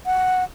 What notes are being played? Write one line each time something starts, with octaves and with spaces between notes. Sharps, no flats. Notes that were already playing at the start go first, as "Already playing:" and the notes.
F#5